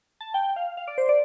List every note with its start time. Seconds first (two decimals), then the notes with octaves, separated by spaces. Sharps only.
0.21 A5
0.34 G5
0.56 F5
0.77 F5
0.88 D5
0.98 C5
1.09 D5